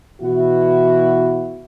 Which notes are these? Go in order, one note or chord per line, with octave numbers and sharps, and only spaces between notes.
B2 E3 E4 F#4